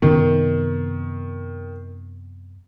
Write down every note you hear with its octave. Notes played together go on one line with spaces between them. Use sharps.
F#2 C3 D#3 B3